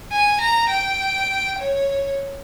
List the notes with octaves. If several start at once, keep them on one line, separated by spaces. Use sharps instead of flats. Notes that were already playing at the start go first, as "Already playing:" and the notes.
G#5
A#5
G5
C#5